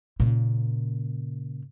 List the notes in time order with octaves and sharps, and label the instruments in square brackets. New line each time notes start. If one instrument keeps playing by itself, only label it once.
[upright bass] A#2 C#3